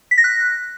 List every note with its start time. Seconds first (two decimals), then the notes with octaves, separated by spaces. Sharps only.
0.11 B6
0.18 A#6
0.24 F#6